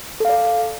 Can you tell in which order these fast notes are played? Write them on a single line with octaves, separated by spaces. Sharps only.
A4 F5 D5